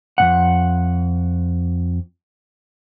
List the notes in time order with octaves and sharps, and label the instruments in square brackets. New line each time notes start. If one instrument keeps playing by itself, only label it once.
[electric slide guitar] F2 G#2 F#5